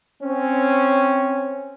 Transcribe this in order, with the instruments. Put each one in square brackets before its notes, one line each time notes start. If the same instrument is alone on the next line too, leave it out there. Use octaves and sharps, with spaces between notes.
[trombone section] C4 C#4